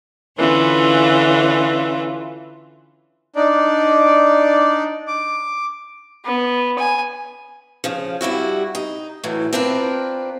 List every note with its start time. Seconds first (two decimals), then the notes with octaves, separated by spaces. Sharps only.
0.37 D3 E3 C#4 F4
3.36 D4 D#4 D5
5.07 D6
6.25 B3
6.78 G#5
7.84 C#3 F3
8.21 G2 G3 E4 F#4
8.75 D#4
9.24 A2 E3 F#3
9.53 C4 D4 F4 A#4 B4